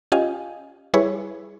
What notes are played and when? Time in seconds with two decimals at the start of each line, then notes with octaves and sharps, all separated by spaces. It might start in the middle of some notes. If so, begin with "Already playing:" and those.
0.12 C#4 F4 G4 D#5 F5 G#5
0.94 G3 E4 G#4 B4 C#5